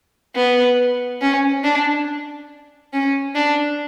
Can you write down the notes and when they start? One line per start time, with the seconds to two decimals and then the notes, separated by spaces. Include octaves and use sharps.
0.36 B3
1.21 C#4
1.64 D4
2.93 C#4
3.35 D4